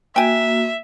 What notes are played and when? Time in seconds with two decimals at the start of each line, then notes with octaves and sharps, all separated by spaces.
0.16 A#3 F#4 E5 G5 G#5